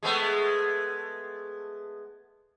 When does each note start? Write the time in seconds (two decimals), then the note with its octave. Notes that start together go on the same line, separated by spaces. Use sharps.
0.03 G#3 A3 B3